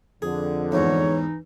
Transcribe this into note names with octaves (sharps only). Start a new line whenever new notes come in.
F2 D3 G#4
E2 G#2 E3 D#4 C#5